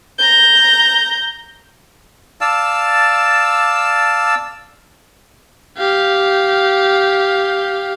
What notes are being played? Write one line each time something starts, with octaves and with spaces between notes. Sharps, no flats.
A#5 G6
D5 F5 A5 E6
G4 F5